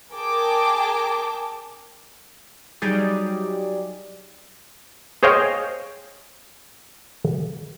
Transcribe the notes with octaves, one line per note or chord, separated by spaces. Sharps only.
G#4 A#4 G5 A5 D6
F#3 G3 D#4 G4 G#4 D5
G#4 C5 C#5 D#5 F5 G5